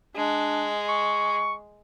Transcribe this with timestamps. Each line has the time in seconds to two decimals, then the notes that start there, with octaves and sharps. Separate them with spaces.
0.16 G#3 D4
0.89 C#6